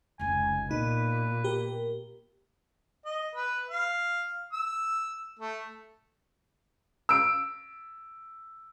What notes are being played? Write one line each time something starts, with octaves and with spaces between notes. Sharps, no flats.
F1 C#2 G#5
A#2 B3 D#4 B4
G4 A#4
D#5
B4
F5
E6
A3
E6 D7